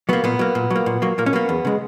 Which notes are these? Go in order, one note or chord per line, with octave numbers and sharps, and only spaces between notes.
F#3 A#3 B3
A#2 B3
F#3 A#3
A#2
F#3
A#3
A#2
F#3 A#3
A#2 A#3
C#4
F#3 A#3 B3
E2
C#3 G#3